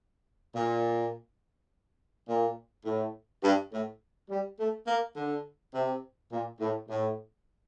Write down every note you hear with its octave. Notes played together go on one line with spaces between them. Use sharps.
A#2
A#2
A2
G2
A2
G3
A3
A#3
D3
C3
A#2
A2
A2